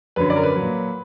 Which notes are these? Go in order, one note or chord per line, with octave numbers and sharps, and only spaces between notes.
F#2 D3 F#3 B4
D5
A#4
B4
A#2 F#3